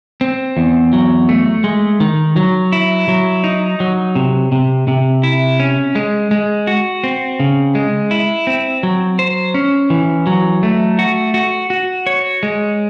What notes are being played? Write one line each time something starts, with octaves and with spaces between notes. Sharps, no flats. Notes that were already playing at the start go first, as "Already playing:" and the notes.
C4
E2
F#3
A3
G#3
D#3
F#3
E4
F#3
D#4
F#3
C3
C3
C3
E4
C#4
G#3
G#3
F#4
C4
C#3
G#3
E4
C4
F#3
C5
C#4
E3
F#3
A3
F#4
F#4
F#4
C#5
G#3